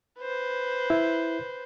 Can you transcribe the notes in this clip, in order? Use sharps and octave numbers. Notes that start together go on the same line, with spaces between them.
B4 C5
E4